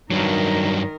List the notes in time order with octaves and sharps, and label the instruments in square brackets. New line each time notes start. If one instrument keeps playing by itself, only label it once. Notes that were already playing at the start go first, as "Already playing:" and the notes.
[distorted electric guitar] G2 F#3 [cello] D#3 A#4